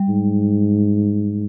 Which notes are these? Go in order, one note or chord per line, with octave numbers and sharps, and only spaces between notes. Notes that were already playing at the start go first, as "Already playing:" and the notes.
Already playing: G3
G#2